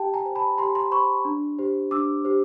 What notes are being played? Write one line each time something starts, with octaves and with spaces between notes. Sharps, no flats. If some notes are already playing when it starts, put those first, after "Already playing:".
Already playing: G4 G5 A5
G#5 A#5
C5
A5 B5
G4 A#5 C6
A#5 C6
C5 B5 C#6
D4
G4 C5
D4 D6 E6
G4 C5